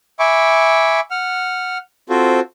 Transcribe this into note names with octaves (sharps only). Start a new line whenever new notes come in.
E5 G#5 B5 C#6 D6
F#5 F6
C4 F4 F#4 A4 C5